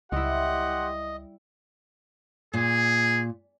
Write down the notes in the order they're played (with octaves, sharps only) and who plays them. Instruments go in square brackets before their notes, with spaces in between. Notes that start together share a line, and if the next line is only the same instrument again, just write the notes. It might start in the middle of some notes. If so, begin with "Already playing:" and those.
[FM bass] C#2 [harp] G3 E4 [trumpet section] G4 F#5 C6 [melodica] D#5
[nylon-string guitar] A#2 [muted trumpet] G#4